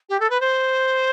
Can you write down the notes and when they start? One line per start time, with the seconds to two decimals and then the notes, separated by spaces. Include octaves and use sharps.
0.09 G4
0.20 A4
0.30 B4
0.40 C5